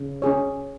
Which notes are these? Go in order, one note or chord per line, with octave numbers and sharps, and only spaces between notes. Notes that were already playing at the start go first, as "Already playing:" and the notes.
Already playing: C#3
C#4 G#4 C#5